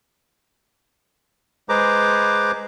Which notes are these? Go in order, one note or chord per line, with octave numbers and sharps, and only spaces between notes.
G#3 G#4 B4 C5 A#5 D6